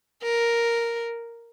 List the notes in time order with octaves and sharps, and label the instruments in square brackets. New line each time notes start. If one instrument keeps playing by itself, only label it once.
[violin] A#4